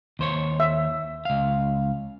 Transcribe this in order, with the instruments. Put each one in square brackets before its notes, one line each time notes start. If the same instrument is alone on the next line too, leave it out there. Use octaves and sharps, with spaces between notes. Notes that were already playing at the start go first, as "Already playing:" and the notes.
[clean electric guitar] D#2 C5 C#5
[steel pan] E5
[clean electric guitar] C#2 F5